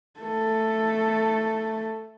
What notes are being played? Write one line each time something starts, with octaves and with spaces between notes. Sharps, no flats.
A3 A4